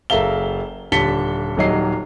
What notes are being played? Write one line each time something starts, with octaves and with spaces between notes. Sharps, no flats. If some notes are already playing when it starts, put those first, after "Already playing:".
F#1 A4 A#4 E5 F5 G7
D#1 D3 A5 B6 C#7 G7
D#1 D#3 F#3 D#5 C7